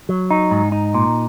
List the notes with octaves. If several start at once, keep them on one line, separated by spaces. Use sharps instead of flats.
F#3
D#4
G#2
D#4
A#2